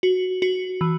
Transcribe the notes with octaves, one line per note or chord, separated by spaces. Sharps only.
F#4
F#4
E3